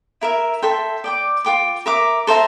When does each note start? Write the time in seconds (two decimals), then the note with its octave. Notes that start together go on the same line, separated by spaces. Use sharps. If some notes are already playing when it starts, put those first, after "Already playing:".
0.21 E4 A#4 E5
0.62 A4 E5 G5 C6
1.04 D5 G5 D6
1.45 F4 C5 G5 D6
1.86 A#4 E5 A#5 D6
2.27 A4 C5 E5 A#5